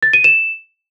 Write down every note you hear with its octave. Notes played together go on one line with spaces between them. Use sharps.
A6
D#7
E7